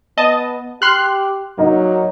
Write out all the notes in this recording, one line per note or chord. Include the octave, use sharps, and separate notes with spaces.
B3 D#5 A5
G4 C6 F6 F#6
F#3 A#3 D#4